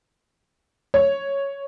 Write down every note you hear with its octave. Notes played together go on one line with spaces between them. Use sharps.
C#5